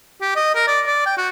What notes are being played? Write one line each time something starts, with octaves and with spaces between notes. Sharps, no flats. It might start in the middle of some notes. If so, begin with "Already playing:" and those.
G4
D#5
A#4
D5
D5
G5
F#4